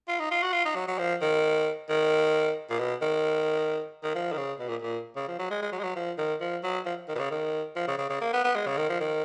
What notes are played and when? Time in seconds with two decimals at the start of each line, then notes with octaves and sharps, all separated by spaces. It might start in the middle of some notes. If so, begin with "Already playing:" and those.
0.08 F4
0.19 D#4
0.31 F4
0.42 F#4
0.53 F4
0.65 D#4
0.75 F#3
0.87 F#3
0.98 F3
1.22 D#3
1.89 D#3
2.70 A#2
2.79 B2
3.02 D#3
4.03 D#3
4.15 F3
4.32 D#3
4.37 C#3
4.59 B2
4.68 A#2
4.82 A#2
5.16 C#3
5.28 F3
5.39 F#3
5.50 G#3
5.62 G#3
5.72 F#3
5.79 G#3
5.83 F#3
5.96 F3
6.18 D#3
6.41 F3
6.63 F#3
6.86 F3
7.09 D#3
7.15 B2
7.19 C#3
7.31 D#3
7.76 F3
7.88 C#3
7.98 C#3
8.10 C#3
8.21 A#3
8.33 B3
8.44 B3
8.56 G#3
8.67 C#3
8.77 D#3
8.89 F3
9.00 D#3